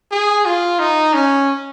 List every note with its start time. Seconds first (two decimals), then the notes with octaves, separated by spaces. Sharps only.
0.11 G#4
0.45 F4
0.79 D#4
1.14 C#4